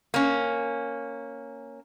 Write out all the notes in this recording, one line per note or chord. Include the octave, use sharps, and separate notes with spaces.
A#3 C#4